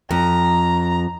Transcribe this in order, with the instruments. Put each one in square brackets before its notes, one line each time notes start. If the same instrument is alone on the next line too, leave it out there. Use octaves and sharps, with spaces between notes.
[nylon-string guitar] F2 [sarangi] A#5